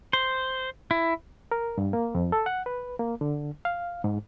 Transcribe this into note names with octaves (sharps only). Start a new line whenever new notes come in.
C5
E4
A#4
G2
A#3
F2
A4
F#5
B4
A#3
D3
F5
G#2